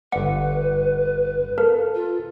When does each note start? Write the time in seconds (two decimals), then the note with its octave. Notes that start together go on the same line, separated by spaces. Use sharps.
0.12 G1 B4 D5 F#5
1.58 A4 A#4 F5
1.94 F4